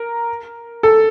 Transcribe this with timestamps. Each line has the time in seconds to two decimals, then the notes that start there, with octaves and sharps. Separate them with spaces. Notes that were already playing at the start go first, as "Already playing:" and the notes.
Already playing: A#4
0.83 A4